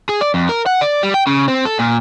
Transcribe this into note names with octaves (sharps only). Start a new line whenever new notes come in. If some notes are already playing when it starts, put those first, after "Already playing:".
G#4
D5
F2
A#4
F#5
D5
G3
G5
C#3
C4
A4
A#2